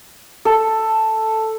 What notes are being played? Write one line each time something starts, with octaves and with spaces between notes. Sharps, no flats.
A4